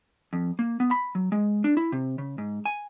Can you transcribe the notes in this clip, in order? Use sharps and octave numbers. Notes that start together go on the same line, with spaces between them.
F2
A#3
B3
B5
F#3
G#3
D4
E4
C3
C#3
G#2
G#5